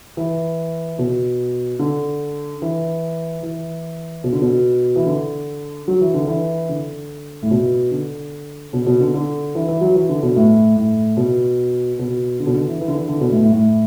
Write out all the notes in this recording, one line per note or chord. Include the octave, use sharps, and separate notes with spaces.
E3
B2
D3
E3
E3
B2
D3
B2
E3
D3
F#3
E3
D3
E3
D3
A2
B2
D3
B2
B2
D3
D3
E3
E3
F#3
E3
D3
B2
A2
A2
B2
B2
D3
B2
D3
E3
E3
D3
E3
D3
B2
A2
A2
A2